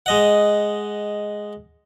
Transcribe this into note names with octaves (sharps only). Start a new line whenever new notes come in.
G#3 D#5 F#5